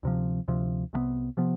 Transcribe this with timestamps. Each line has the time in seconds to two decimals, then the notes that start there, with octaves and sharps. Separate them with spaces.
0.03 D2 C3 F3
0.48 D2 C3 F3
0.93 C2 C3 F3 B3
1.37 C3 F3 B3